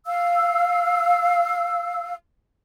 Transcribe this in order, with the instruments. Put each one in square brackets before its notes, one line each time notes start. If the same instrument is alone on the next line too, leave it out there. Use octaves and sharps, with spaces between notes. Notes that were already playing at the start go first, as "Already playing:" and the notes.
[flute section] F5 E6